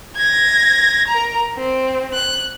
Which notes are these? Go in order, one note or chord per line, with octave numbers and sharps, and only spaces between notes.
G#6 A#6
A#4 A#5
C4
F#6